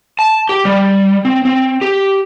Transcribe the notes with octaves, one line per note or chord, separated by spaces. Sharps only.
A5
G4
G3
C4
C4
G4